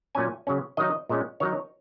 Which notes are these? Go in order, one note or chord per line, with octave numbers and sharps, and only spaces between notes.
A#2 F#3 C#4 G#5
C#3 F#3 C#4
D#3 F#3 D#4 D#5
A#2 G#3 C#4
D#3 F#3 D#4 C#5